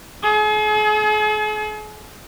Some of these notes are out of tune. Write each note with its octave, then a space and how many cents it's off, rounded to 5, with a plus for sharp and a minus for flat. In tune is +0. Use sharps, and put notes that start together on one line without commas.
G#4 +40